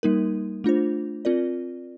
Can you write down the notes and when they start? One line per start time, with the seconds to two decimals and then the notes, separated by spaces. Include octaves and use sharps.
0.03 G3 A#3 D#4 A#4
0.64 A3 D4 F4 C5
1.25 C4 F4 A#4 D5